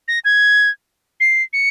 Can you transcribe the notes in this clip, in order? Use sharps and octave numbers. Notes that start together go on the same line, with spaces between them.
A#6
G#6
C7
C#7